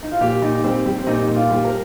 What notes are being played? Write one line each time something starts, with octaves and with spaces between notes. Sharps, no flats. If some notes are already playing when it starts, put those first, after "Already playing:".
D#4
F4
A#2 G4
A#2 D#4
G3 C4
G3
C4
A#2 D#4
A#2
F4
G3
A#4